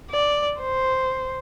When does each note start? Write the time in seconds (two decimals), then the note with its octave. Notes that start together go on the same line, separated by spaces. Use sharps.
0.10 D5
0.60 C5